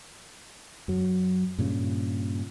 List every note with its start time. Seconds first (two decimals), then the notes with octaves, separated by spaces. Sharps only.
0.88 F#2 F#3
1.58 G2 A#2 C#3